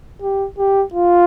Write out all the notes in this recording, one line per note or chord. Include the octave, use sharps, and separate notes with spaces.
G4
G4
F4